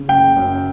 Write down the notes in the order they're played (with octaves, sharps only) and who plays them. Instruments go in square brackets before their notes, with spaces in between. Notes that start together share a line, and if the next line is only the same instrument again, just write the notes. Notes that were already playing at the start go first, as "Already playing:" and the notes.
Already playing: [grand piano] C#3
F#1 G5
F#2